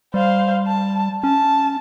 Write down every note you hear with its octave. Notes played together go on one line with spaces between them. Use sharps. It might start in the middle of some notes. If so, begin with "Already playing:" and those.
G3 C5 F5
A5
C#4 A5